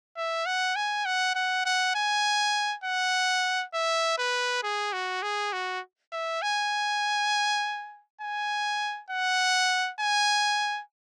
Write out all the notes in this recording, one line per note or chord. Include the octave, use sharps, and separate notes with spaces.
E5
F#5
G#5
F#5
F#5
F#5
G#5
F#5
E5
B4
G#4
F#4
G#4
F#4
E5
G#5
G#5
F#5
G#5